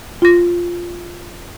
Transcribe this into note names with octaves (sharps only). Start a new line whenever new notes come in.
F4 A#6